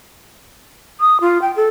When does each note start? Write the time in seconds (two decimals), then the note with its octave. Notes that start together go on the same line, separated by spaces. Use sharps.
1.00 D#6
1.21 F4
1.42 G5
1.56 A4